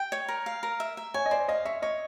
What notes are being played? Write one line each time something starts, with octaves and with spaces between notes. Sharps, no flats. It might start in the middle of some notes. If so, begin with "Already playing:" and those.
Already playing: G5
C#5
A#4
F5
A#4
E5
E5
C#5 G#5
D#5
C5 D5
D#5 F5
C#5 E5
C#5 D#5